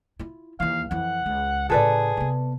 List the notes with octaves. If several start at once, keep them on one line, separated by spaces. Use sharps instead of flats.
E4 F4
D#2 E3 F5
F2 E3 F#5
C#2
A2 C#3 G#4 A4 B4 D5
C3 B3